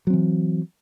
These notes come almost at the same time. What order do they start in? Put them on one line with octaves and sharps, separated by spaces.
F#3 C4 E3